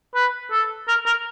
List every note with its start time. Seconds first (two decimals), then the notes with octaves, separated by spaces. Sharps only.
0.15 B4
0.51 A4
0.88 A#4
1.06 A#4